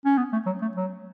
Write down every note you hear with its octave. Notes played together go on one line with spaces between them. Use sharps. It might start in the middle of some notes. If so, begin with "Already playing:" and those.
C#4
B3
A3
F#3
A3
F#3